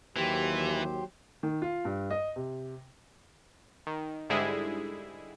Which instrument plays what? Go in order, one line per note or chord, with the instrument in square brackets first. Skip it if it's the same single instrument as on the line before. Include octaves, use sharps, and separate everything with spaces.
[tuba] D#2 [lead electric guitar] E3 [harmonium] F#3 G4 C5
[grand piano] D#3
F4
G2
D#5
C3
[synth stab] D#3
G#2 D3 G3 G#3 E4 G#4